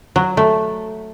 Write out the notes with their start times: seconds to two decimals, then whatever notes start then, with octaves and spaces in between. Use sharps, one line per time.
0.16 F#3
0.37 A3